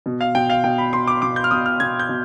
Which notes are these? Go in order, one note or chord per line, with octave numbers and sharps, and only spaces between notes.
B2
F5
B2 G5
F5
B2 G5
B5
B2 C6
D6
B2 D6
G6
F6
B2 D#6
F6
B2 G#6
G6
B2